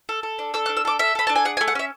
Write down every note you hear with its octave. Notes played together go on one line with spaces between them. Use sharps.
A4
A4
D4
A4 E6
F#6
D4
E6
A4 D6
A4 E5
A4 B5
D4 A5
G#5
G#4 F#5
G#5
A3
F#5
C#4 E5